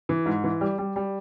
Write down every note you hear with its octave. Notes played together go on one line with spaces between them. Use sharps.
E3
G#2
E3
G3
G3
G3